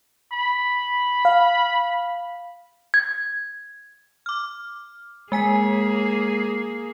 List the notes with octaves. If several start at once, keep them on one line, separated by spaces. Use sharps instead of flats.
B5
F5
G#6
D6 F6
G#3 A#3 G#4 G#5 B6